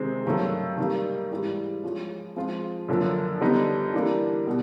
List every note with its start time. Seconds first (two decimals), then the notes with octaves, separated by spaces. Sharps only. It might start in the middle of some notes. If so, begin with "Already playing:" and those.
Already playing: C3 D#3 G#3 C4
0.26 G2 D#3 F#3 A3
0.78 D#3 G3 A#3 D#4
1.31 G#2 E3 G3
1.84 F3 G#3 C#4
2.36 F3 G#3 C4 F4
2.88 F#2 D3 F3 A#3
3.41 D3 G3 B3 D#4
3.94 E3 G3 A#3 D4
4.46 B2 G3